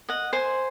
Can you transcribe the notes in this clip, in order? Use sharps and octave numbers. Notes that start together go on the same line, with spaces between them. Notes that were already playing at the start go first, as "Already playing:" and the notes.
D#5 F#5
C5 G#5